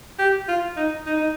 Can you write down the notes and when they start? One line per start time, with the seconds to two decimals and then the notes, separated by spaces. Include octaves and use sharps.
0.19 G4
0.48 F4
0.77 D#4
1.06 D#4
1.17 D#4